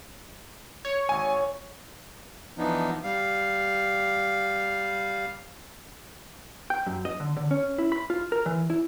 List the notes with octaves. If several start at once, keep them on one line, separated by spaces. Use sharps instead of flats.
C#5
G#1 G#5
E3 F3 B3 D4 D#4
G3 F5
G5
F#2
D#5
D3
D3
C#4
E4
B5
F4
A#4
E3
E4